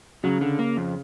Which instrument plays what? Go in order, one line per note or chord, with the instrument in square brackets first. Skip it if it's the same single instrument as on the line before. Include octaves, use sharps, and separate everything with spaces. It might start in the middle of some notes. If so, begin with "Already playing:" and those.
[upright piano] C#3 [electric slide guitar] F#3
[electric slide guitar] D3
A#3
F2